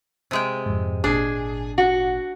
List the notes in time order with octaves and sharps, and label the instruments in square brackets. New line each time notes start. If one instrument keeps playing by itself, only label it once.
[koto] C3 G#3 G5
[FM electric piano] F2 G#2
[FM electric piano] G#1 A#2 [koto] D4 [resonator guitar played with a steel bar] G#4
[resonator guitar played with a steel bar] F#4